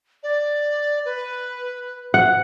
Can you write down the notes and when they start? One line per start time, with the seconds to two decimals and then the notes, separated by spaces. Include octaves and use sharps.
0.23 D5
1.05 B4
2.14 F#5